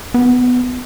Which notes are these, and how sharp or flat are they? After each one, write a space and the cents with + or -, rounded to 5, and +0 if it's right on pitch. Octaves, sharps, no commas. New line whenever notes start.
B3 +10